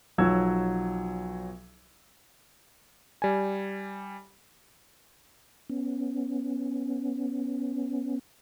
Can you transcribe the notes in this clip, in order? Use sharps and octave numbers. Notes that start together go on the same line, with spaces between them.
B1 F3 F#3 E6 G#6
G3 G#5
B3 C#4